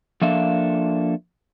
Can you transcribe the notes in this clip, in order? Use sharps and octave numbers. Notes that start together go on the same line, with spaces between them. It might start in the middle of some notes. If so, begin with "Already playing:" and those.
F3 A#3 D4 A4 E5 F5